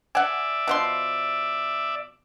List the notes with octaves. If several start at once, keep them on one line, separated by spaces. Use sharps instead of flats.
D5 E5 F#5 G#5
B2 F3 C6